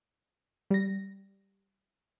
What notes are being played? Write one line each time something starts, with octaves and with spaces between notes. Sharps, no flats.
G3 A#6